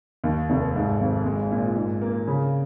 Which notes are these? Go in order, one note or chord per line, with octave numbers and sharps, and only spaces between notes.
D#2
F1
G#2
G#1
G#3
A#2
G#2
A#3
C#3